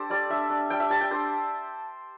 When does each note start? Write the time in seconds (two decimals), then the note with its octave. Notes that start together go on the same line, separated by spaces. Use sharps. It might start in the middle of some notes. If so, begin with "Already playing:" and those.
Already playing: D4 G4 A4 C5
0.10 G3 D5
0.30 D4 E5
0.50 D4
0.70 G3 G5
0.80 E5
0.90 G3 A5
1.01 G5
1.11 D4 C5